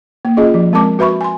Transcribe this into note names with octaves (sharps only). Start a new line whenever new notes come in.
A#3
C#4 F4 G#4 D#5
F3
G#3 C4 A#4 A5 D6
F#4 B4 E5 B5 C#6
G#5 C6